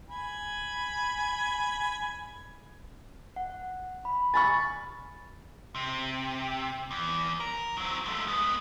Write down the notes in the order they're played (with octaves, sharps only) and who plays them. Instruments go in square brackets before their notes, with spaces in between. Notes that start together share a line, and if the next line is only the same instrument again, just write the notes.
[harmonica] G#5 B5
[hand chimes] F#5
B5
[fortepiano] G#5 B5 C#6 [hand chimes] A6
[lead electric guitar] C3
E2
A#4
F#3 C4
G#3 A3
G#3 B3